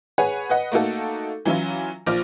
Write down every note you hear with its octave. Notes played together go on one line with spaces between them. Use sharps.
G#4 B4 C#5 F#5 G#5
B4 D#5 F#5
A3 A#3 D#4 F#4 A4
E3 F#3 C#4 E4 F4
A#1 F3 D6 F6